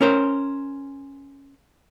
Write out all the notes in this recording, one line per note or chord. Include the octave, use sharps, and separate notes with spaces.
C#4 A#4 C5